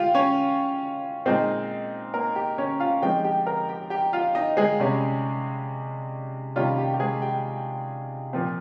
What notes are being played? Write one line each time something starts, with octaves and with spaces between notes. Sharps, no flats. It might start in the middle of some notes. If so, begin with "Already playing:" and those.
Already playing: G#3 F4 G4 F5 G5
C#4 C#5
A#2 G#3 C4 D#4 C5
A#3 A#4
G4
C#4 C#5
F4 F5
F3 G#3 C4 D#4 G4 G5
G4 G5
A#4 A#5
G4 G5
G4 G5
F4 F5
D#4 D#5
G#3 G#4
C3 G3 C#4
C3 D#3 G3 A#3 C#4 F4
G4
G4
G#3 G#4
G4 G5
A#2 F3 C4